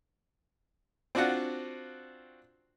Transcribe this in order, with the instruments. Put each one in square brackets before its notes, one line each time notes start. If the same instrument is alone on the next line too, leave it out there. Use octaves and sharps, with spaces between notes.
[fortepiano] C4 D4 F4 F#4 F#5